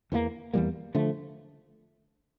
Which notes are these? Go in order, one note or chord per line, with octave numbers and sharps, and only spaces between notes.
E2 E3 G3 A#3
E2 E3 G3 A#3
D3 F3 A3